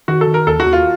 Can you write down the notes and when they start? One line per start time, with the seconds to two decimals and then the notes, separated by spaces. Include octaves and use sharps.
0.08 D#3 F#4
0.21 A4
0.27 D#3
0.34 A#4
0.47 D#2 A4
0.60 F#4
0.66 D#2
0.73 F4